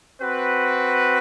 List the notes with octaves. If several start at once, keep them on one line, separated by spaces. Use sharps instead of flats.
C4 F#4 B4